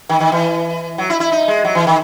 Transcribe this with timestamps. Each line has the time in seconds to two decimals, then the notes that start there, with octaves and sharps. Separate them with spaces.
0.09 D#3
0.20 D#3
0.32 E3
0.98 F#3
1.10 E4
1.20 E4
1.32 D#4
1.48 G#3
1.65 F#3
1.75 E3
1.87 D#3